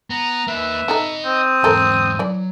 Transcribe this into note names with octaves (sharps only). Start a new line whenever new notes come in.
B3 A#5
A#3 D#4 B4 E5
D#4 A4 D#5 A#5 B5
C4 D#6
E2 G#2 A4 A#4 C5
E3 F#3 D5